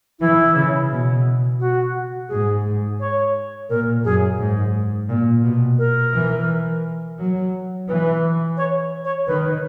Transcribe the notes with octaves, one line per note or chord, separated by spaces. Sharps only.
E3 E4
C#3
B2
F#4
G#2 G#4
C#5
A#2 A#4
F#2 G#4
G#2
A#2
B2
A#4
E3
F#3
E3 B4
C#5
C#5
D#3 B4